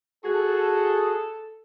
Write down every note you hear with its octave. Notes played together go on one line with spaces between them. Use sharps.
F#4 G#4 A4